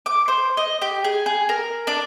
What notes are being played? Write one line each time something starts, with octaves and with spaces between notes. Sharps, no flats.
D6
C5
D#5
G4
G#4
G#4
A#4
D4